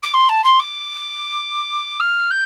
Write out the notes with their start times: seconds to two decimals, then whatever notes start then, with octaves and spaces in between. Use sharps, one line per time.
0.02 D6
0.13 C6
0.29 A5
0.44 C6
0.59 D6
1.99 F6
2.30 G6